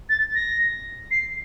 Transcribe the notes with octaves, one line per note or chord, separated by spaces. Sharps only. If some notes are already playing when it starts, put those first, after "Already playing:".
A6
A#6
C7